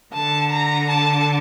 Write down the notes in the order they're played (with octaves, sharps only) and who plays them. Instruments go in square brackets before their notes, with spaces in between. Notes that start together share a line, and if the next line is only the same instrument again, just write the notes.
[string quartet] D3 [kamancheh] A5
[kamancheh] A#5
A5